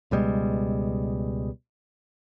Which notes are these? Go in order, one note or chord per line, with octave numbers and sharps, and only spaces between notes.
C#2 B2 G3 G#3